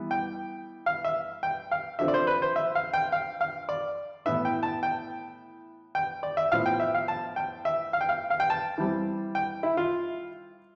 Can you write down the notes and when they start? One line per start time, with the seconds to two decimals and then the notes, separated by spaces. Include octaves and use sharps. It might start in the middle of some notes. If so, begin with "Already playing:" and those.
Already playing: E3 G3 B3
0.11 G5
0.86 F5
1.05 E5
1.43 G5
1.71 F5
1.99 D3 F3 C4 E5
2.08 D5
2.14 C5
2.27 B4
2.42 C5
2.56 E5
2.75 F5
2.94 G5
3.12 F5
3.41 F5
3.69 D5
4.26 A2 E3 B3 E5
4.45 G5
4.63 A5
4.83 G5
5.95 G5
6.23 D5
6.37 E5
6.52 A2 F3 B3 F5
6.66 G5
6.80 E5
6.95 F5
7.08 A5
7.36 G5
7.65 E5
7.93 F5
8.01 G5
8.09 F5
8.30 F5
8.40 G5
8.50 A5
8.78 E3 G3 C4
9.35 G5
9.63 E4
9.77 F4